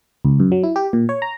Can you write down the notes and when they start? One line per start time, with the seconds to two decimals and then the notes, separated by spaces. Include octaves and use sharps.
0.25 C#2
0.40 F#2
0.52 F#3
0.63 E4
0.76 G4
0.93 A#2
1.09 C#5
1.22 A#5